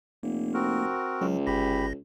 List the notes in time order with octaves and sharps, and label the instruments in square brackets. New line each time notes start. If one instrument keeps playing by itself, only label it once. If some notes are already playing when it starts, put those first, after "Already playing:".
[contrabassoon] F1 [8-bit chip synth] A#3
[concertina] C4 F#4 A#4
[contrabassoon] C#2 [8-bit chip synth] F#3
[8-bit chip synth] G1 A#6 [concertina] G4 B5